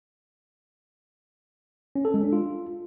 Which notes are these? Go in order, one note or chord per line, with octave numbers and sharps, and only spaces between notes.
C#4
A4
G#3
D4
F4